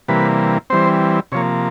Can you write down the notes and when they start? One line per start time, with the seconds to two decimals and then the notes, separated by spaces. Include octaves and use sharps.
0.08 C3 E3 G3 A#3 B4
0.70 E3 G3 C4 C5
1.32 C3 F3 A#3 C#5